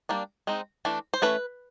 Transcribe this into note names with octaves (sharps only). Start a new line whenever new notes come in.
G3 A#3 D4
G#3 C4 D#4
E3 A3 D4
C5
E3 A3 C#4 B4